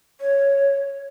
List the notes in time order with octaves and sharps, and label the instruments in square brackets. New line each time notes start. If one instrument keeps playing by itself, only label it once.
[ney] C#5